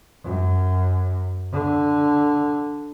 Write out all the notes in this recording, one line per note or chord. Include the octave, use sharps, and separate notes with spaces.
F#2
D3